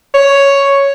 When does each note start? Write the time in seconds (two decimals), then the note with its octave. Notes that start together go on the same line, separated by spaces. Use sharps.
0.15 C#5